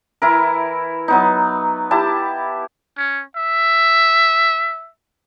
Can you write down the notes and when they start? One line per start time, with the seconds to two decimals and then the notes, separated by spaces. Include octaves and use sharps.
0.22 E3 E4 A#4
1.08 F#3 B3 D#4
1.91 E4 G4 A5
2.98 C#4
3.36 E5